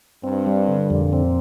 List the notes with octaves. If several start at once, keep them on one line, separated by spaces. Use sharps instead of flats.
G2 C4
G3
D3
F2 A#2
C4